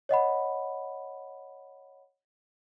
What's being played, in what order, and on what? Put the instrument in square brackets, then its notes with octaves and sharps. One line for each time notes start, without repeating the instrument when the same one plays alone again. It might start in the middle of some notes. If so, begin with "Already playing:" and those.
[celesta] C#5 D#5 F#5 B5